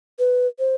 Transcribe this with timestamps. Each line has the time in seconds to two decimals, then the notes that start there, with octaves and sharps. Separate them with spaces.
0.19 B4
0.59 C5